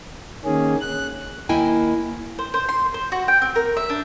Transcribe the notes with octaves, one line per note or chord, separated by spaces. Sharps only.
D#3 A#3 C#4 G#4
F#6
D#2 A#3 E4 D#5 G5 G#5
C5
C5
C6
C5
F#4
G5
C4
A#4
E5
D4